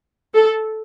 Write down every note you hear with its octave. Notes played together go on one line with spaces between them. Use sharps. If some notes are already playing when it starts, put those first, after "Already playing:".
A4